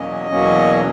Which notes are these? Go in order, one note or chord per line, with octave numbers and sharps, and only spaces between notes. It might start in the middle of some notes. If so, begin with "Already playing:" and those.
Already playing: E2 B2 F#3 A#3 C#4 D#5
E2 B2 F#3 A#3 C#4